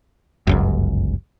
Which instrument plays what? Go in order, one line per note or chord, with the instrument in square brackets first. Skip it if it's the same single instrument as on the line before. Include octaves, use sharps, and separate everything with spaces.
[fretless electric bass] G1 C#2 F#2